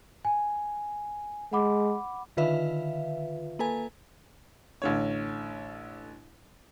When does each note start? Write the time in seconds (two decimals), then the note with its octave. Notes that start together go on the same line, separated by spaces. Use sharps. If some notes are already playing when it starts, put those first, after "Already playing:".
0.25 G#5
1.53 G#3 F#5 B5 D6
2.37 D3 D#3 F4 B4 E5 F5
3.59 A#3 A4 B4 G#5
4.82 A1 D3 C#5